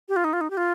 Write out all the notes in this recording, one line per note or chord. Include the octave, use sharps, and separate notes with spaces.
G4
F4
D#4
F4
D#4
G4
F4